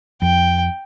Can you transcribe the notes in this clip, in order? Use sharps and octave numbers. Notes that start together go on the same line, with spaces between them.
F2 G5